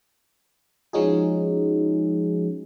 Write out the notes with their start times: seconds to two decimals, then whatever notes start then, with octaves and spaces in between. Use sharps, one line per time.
0.93 F3 G#3 C#4 D#4 F#4 G#4